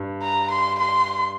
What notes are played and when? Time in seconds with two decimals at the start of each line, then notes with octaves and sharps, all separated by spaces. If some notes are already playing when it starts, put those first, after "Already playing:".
Already playing: G2
0.23 A#5
0.51 C6
0.79 C6